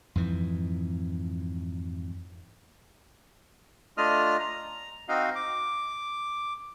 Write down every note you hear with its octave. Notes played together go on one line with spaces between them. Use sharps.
F2 G#2 E3
A3 D4 F4 D#5 D#6 F6
A#5
C4 D#4 F#4 D#5 F5
D6